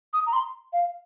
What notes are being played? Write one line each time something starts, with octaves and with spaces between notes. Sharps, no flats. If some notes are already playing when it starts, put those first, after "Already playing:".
D#6
A#5
C6
F5